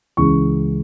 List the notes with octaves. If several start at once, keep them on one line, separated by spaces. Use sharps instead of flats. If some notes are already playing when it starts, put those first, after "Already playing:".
C#2 C#3 E3 C#6